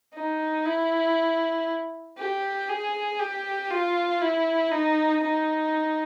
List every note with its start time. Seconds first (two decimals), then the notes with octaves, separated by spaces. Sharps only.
0.14 D#4
0.65 E4
2.18 G4
2.69 G#4
3.20 G4
3.71 F4
4.21 E4
4.72 D#4
5.23 D#4